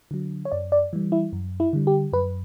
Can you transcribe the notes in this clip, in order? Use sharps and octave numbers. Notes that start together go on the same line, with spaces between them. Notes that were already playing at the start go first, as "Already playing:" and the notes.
D3 F#3
C#5
F#2 D5
D5
E3 G3
E4
F#2
E4
D3 G3
G4
F#2 B4